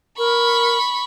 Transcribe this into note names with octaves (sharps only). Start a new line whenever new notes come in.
A#4 B5 C#6